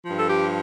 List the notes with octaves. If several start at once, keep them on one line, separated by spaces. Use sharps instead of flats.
G2 F3
A4
G4